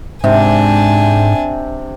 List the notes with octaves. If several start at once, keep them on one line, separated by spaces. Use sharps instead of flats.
G#2 C3 D4 G#5